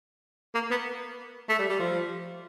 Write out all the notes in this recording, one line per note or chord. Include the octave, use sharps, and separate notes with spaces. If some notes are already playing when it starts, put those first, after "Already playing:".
A#3
B3
A3
G3
G3
F3